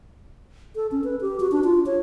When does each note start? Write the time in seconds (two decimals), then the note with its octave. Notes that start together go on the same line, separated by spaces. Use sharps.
0.76 A4
0.92 C#4
1.04 B4
1.21 G4
1.40 F#4
1.52 D4
1.64 F4
1.86 C#5